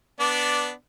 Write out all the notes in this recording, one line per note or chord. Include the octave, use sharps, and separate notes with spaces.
B3 D4 D5